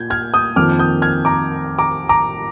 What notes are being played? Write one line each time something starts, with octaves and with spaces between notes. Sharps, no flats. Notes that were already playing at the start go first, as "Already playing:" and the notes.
Already playing: A#2 G6 G#6
F6 G#6
D#6 G6
F2 D#3 A#3 D6 F6
D#6 G6
F6 G#6
A#5 D6
A#5 D6
A#5 D6